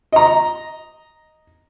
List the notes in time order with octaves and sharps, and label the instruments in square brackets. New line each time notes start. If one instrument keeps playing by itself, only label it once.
[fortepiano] D#5 A#5